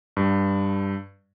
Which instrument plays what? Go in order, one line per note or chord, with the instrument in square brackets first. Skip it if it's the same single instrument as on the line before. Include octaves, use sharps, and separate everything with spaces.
[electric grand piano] G2